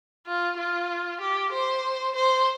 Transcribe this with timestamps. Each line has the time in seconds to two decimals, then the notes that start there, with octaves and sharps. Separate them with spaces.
0.27 F4
0.59 F4
1.21 G4
1.53 C5
2.15 C5